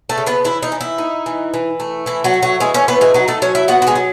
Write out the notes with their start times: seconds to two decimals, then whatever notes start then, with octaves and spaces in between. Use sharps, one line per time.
0.09 A3 A4
0.17 C#3
0.26 B3 B4
0.45 E3 E4
0.63 D#4
0.72 E3
0.81 E4
0.98 D#4
1.26 E3
1.54 E3
1.80 A3
2.06 E3 E4
2.24 F#3 F#4
2.34 A3
2.43 F#3 F#4
2.60 E3 G#3 G#4
2.74 C#4 C#5
2.88 A3 B3 B4
3.01 G#3 G#4
3.14 F#3 D#4 F#4
3.28 A3 A4
3.42 F#3 C#4 C#5
3.55 E4 E5
3.68 B3 F#4 F#5
3.82 F#4
3.87 G#3 G#4
3.95 F#3